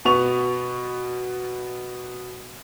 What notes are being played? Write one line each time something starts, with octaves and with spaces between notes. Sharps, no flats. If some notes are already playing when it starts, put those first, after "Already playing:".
B2 B3 C#6 F7